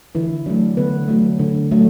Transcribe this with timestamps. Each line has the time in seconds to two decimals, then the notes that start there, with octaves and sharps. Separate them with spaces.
0.15 D3 E3 E4
0.46 F#3 A3 D4
0.77 D3 B3 B4
1.08 F#3 A3
1.39 D3
1.71 F#3 A3